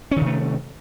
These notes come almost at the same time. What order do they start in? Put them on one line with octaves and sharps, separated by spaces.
C#4 D#3 C3 A3